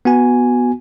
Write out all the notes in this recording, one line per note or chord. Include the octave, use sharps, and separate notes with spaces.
B3 F#4 G#5